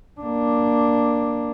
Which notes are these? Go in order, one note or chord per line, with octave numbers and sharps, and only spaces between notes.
A#3 D4